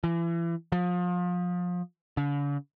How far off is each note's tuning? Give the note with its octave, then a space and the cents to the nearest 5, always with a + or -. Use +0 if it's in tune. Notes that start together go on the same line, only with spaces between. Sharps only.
E3 +35
F3 +30
D3 -45